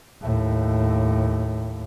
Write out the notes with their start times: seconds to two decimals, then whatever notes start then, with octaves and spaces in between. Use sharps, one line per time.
0.22 D#2 A2